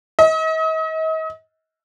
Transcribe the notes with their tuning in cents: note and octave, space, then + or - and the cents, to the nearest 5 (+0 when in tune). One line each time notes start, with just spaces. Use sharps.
D#5 +40